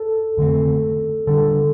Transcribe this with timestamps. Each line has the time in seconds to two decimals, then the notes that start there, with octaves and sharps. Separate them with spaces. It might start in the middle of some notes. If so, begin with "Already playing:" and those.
Already playing: A4
0.37 F2 D3 A3 C4
1.27 D3 G3 D4 A4